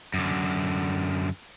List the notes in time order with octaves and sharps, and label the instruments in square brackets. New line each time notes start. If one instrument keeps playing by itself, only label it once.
[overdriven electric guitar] F#2 D3